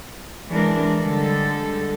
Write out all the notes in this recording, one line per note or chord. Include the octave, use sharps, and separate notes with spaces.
E3 G#3 D4 A#4
D3 G3 G#3 A4